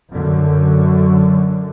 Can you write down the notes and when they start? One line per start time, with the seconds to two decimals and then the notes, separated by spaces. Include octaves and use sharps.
0.12 F#2 D3